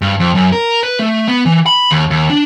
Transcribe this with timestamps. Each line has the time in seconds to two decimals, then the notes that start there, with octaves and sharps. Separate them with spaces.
0.02 G2
0.20 F2
0.35 F#2
0.52 A#4
0.83 B4
0.99 A3
1.28 B3
1.46 E3
1.66 B5
1.91 D#2
2.10 D#2
2.30 D4